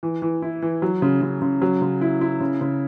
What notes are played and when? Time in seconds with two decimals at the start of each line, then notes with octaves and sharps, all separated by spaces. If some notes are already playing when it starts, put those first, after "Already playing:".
0.03 E3
0.22 E3
0.42 E4
0.62 E3
0.82 F#3
1.02 C#3
1.22 C#3
1.42 C#3
1.62 F#3
1.82 C#3
2.01 E4
2.21 E4
2.41 C#3
2.61 C#3